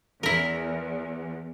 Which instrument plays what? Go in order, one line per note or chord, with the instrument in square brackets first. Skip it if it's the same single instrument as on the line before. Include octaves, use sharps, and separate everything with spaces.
[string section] E2 [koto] E4 A#4